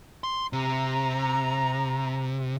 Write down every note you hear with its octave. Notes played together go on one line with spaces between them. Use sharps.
C6
C3 A#5